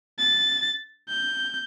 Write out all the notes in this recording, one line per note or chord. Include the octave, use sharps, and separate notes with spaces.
A6
G6